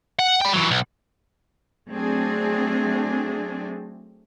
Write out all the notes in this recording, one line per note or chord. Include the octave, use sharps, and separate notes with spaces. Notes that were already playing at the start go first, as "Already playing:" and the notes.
F#5
G5 B5
E3 F#3
B1
F#3 A3 C4 D4 G#4